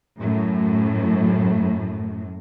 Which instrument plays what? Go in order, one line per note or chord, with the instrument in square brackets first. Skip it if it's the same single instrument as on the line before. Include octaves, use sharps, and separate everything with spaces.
[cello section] F#2 A2